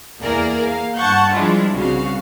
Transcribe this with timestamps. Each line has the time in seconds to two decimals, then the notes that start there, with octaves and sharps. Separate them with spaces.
0.21 E2 A#3 G#4 A#4 D5
0.67 A#3 F5
0.97 G2 F#5 A5 C#6 G6
1.33 F3 G3 G#3 D4 E4 F4
1.72 C2 C#3 F#4 F5